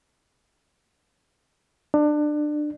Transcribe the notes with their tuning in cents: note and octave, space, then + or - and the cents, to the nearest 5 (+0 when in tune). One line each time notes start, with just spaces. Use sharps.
D4 +25